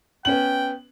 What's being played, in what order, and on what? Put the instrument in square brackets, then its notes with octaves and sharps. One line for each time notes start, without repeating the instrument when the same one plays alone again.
[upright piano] B3 C#4 F#7 [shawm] G5